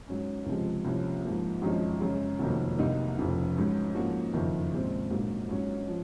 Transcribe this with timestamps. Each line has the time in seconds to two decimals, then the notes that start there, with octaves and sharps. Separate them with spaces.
0.08 G#2 F#3 C#4
0.46 C#2 C3 F3 G#3
0.85 C2 C3 F3 A#3 C#4
1.24 G#2 F3 A#3
1.62 G#1 F#2 F3 G#3 D#4
2.01 F#2 C#3 G#3 C#4
2.39 F1 F2 D#3 F#3 A#3
2.78 C2 C3 F#3 A#3 D#4
3.17 F1 F2 C#3
3.56 G#2 F#3 C#4
3.94 G#2 F3 A#3 C#4 F#4
4.33 F#1 F2 D#3
4.72 A#2 G#3 C4
5.10 A#1 G#2 F#3 A#3
5.49 G#2 F#3 C#4
5.87 F3